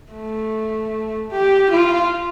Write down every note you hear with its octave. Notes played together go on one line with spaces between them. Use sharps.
A3
G4
F4